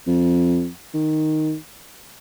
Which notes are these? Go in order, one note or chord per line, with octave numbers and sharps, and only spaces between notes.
F2
D#3